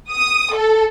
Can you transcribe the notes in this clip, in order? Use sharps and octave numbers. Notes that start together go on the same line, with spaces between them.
D#6
A4